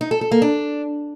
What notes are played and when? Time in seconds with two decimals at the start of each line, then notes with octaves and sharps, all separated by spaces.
0.01 D#4
0.11 A4
0.21 A4
0.31 A#3
0.42 D4